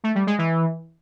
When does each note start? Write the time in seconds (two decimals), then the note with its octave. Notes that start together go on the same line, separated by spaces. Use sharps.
0.04 A3
0.15 G3
0.27 G#3
0.38 E3